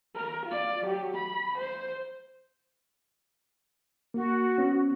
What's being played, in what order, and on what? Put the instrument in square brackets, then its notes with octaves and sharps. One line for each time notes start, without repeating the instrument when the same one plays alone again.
[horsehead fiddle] A#4
F4 D5
F#3 G4
B5
C5
[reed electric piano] A#3 [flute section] F#4
[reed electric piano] B3 C#4